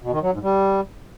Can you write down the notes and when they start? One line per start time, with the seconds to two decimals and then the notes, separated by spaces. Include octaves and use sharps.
0.02 B2
0.12 D#3
0.22 F#3
0.32 G#2
0.43 G3